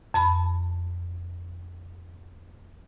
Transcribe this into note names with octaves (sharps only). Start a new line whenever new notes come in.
F2 A5 B5